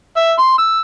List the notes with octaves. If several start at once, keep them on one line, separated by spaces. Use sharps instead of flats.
E5
C6
E6